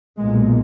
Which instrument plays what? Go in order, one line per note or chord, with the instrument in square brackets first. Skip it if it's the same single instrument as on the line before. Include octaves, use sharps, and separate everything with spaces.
[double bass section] B1 A#2 G#3